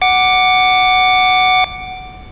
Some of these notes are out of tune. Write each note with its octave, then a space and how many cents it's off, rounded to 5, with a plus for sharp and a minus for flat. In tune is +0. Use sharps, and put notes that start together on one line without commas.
F#5 +5 D6 +0